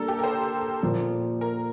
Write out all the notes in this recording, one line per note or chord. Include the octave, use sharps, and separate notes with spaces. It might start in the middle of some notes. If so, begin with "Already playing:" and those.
Already playing: G3 A#3 D4 A4 A#4
G4
A#4
C5
A#2 F3 A#3
A#4